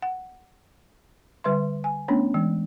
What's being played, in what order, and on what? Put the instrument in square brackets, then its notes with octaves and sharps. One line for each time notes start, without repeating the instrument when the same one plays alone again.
[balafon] F#5
D3 G3 B4 E5 C6
G#5
A3 B3 C#4 D4 C#5
E3 G#3